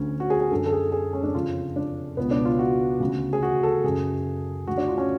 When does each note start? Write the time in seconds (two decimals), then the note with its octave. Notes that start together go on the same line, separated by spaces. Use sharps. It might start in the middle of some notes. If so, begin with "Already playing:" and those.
Already playing: D2 D3 C#4
0.20 F#4
0.30 G#4
0.40 G#4
0.51 F#2 D3 A4
0.66 A4
0.73 G#4
0.92 G#4
1.13 C#4
1.23 D4
1.35 F2 C#3 F4
1.76 D4
2.17 C#2 B2 B3
2.31 D4
2.45 F4
2.59 F#4
3.00 D2 C#3
3.33 G#4
3.43 F#4
3.63 A4
3.84 F#2 C#3 G#4
4.67 D2 D3 F#4
4.78 D4
4.88 F4
4.98 C#4